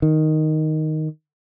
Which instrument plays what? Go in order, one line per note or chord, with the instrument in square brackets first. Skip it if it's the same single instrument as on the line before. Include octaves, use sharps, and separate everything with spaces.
[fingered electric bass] D#3